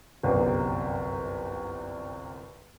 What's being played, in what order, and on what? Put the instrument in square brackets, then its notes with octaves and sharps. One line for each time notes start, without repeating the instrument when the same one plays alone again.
[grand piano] G1 C2 F#2 C3